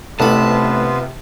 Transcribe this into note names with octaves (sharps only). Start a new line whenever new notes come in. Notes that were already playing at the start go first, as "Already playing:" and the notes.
A1 C3 B3 F4 B4 A5 B5